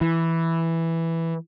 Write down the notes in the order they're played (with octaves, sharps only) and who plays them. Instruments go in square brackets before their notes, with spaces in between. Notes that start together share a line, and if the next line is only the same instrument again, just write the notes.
[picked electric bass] E3